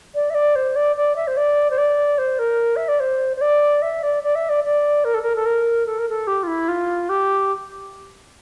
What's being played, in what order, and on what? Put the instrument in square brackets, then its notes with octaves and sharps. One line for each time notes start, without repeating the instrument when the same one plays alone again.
[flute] D5
E5
D5
C5
D5
D5
E5
C5
D5
C5
D5
C5
A#4
E5
D5
C5
C5
D5
E5
D5
D5
E5
D5
D5
A#4
A4
A#4
A4
A#4
A4
A#4
A4
G4
F4
E4
F4
G4